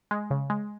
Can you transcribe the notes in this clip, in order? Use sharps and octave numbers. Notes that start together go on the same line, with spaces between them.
G#3
C#3
G#3